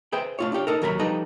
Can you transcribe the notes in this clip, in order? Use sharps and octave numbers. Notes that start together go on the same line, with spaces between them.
G#4 B4 C5 E5 G5
A3 F4 C#5
D4 F4 G4 C#5
D#4 A4 A#4
D#2 F#3 A#4 A5 B5
F3 G3 D#4 A4 B4 A#5